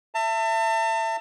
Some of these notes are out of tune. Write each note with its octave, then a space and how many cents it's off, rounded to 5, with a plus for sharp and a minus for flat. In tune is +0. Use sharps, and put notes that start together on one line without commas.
E5 +15 A5 +35